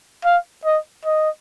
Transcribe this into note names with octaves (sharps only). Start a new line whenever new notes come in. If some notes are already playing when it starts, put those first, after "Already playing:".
F5
D#5
D#5